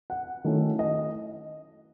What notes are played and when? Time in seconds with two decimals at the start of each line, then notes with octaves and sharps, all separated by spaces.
0.10 F#5
0.44 D#3 F#3 A3 C#4 E4
0.79 D#5